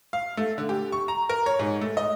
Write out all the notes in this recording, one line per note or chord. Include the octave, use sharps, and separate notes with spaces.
F5
A3
D3
G4
C#6
A#5
A#4
C#5
G#2
A3
D#5